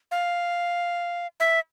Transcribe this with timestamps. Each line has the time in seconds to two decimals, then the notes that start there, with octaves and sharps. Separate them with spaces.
0.11 F5
1.40 E5